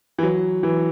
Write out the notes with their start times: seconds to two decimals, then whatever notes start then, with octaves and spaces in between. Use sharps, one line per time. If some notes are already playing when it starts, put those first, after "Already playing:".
0.18 E3
0.23 F#3
0.63 E3